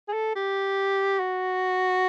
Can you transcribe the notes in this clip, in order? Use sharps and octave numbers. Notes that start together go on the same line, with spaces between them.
G#4
A4
G4
F#4